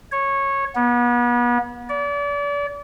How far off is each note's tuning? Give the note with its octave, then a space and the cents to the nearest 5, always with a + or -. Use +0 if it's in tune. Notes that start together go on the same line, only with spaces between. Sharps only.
C#5 -15
B3 -35
D5 -35